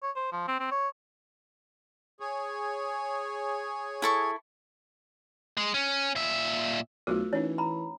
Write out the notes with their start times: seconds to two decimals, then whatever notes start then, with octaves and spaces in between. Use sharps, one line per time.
0.03 C#5
0.16 C5
0.32 F3
0.48 C4
0.60 C4
0.71 C#5
2.20 G#4 C#5
4.02 E4 A4 C#6
5.57 G#3
5.74 C#4
6.16 A#2 E5
7.07 B1 A3 F4 F#4 A#4 C5
7.33 E3 C#4 D#4 C#5
7.58 A#5 B5